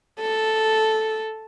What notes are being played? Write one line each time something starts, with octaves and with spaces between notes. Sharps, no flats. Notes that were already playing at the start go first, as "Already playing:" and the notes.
A4